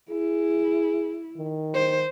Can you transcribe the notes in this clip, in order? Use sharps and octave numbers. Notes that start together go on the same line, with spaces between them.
E4 G#4
D#3
C5